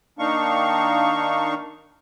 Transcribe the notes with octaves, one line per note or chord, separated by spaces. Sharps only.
D#3 A#3 D4 D#4 F5 C#6